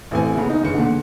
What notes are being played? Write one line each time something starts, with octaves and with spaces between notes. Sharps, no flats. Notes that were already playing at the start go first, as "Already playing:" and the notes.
A1 A3 C4 G#5
C#3 A#3 B3
D#4
G1 C#3 C#7
A#2 D3
A#2